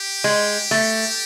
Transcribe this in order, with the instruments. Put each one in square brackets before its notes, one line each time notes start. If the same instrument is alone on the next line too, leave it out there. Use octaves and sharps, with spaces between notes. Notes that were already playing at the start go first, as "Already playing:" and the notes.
Already playing: [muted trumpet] G4
[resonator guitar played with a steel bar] G#3
A3